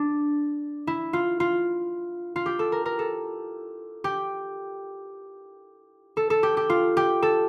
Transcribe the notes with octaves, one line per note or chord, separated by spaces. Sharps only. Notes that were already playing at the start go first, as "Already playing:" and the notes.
Already playing: D4
E4
F4
F4
F4
G4
A4
A#4
A#4
A4
G4
A4
A4
G4
G4
F4
G4
A4